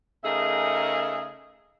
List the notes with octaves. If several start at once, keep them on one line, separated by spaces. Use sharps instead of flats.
C#3 A3 D#4 G#4 A#4 E5